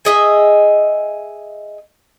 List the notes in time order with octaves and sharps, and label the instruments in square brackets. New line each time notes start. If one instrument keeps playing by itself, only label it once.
[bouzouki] G#4 D#5 E5